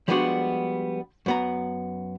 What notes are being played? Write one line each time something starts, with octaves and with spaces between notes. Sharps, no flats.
F3 G3 G#3 B3 D4 F#4
F#2 B3 A#5